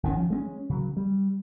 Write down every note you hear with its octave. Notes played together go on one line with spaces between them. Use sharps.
G1 D#3 C#4
F3
G#3 C4 C#4
C#3 F#3
G3